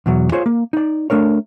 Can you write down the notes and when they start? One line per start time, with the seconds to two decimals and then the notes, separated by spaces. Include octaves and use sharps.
0.06 E2 B2 F#3
0.32 F4 G#4 C5 C#5
0.46 A#3
0.73 D#4 D5
1.10 A3 D4 A#4 C#5